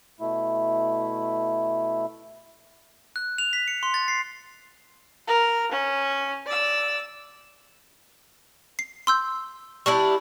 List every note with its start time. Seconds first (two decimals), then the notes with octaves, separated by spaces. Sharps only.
0.20 B2 A3 E4
3.16 F#6
3.38 F7
3.53 B6
3.68 C#7
3.83 C6
3.94 A6
4.08 C7
5.28 A#4
5.71 C#4
6.46 D5 E6
8.79 C7
9.07 C6 E6 G6
9.86 G3 D4 E4 C#6